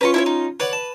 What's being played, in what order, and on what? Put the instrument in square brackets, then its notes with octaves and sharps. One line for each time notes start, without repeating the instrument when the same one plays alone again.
[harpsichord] C#4 F4 [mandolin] B4 A#5 C#6
[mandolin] E4 A4 C#5
D#4
[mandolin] B4 [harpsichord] C#5 D5 F#5
[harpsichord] A5